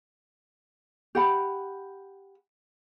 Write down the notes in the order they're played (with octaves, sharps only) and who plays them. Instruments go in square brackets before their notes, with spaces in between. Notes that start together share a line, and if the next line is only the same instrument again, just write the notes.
[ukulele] G4 F#5 B5